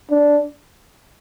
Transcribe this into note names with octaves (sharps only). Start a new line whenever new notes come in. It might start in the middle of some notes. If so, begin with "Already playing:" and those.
D4